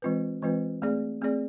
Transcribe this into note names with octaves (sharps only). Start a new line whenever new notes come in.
E3 G#3 C4 F4 B4
E3 G#3 C4 F4 B4
A3 C4 G#4 D5
A3 C4 G#4 D5